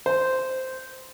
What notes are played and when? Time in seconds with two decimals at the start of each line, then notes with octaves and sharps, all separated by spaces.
0.06 C5